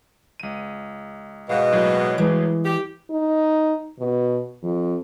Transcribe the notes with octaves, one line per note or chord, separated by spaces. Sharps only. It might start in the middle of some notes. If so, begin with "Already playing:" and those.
C#2 D#7
G#2 B2 F5
A2 F#3 A#3
E3 G#3
G4
D#4
B2
F2